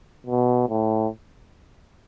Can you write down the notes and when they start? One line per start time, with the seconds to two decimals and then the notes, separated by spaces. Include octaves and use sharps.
0.27 B2
0.69 A2